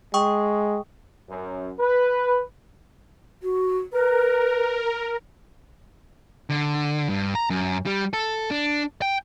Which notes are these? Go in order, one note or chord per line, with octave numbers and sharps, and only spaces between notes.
G#3 G5 C#6 D#6
F#2
B4
F#4
A#4 B4
D3
G2
A#5
F#2
G3
A4
D4
G5